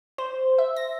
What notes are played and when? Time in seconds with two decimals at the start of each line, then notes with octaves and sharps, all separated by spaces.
0.18 C5
0.58 E5
0.76 A#6